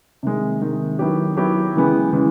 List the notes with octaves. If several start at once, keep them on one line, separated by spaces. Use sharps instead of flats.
C3 D#3 G#3
C3 D#3 G#3
D#3 F#3 B3 E4 G4
D#3 F#3 B3 E4 G4
C#3 E3 G#3 B3
C#3 E3 G#3 B3